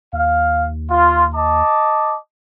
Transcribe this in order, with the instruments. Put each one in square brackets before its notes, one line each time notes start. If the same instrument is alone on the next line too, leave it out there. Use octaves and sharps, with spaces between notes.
[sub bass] D#2 [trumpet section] F5
[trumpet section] F4
D#5 A5 D6